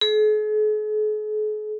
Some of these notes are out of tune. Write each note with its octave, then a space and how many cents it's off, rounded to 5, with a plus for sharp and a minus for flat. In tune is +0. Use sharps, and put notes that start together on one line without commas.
G#4 +45